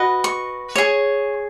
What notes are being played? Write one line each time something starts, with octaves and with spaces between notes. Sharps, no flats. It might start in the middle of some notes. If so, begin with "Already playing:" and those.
Already playing: F#4 B4 D#5
C#6
G#4 C#5